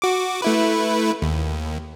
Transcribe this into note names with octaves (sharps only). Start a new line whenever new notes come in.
F#4 D6
A3 E4 B4
D#2